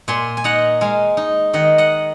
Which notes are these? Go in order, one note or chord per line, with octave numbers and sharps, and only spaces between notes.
A#2 G#5 C6
G#5
D#4 F#5 A#5
G#3 F5 G#5
D#4
D#3 D#5 F#5
D#5 F#5